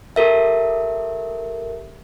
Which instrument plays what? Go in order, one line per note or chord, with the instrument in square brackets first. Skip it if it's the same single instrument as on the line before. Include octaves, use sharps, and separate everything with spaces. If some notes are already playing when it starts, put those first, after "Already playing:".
[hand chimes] G4 A4 A#4 E5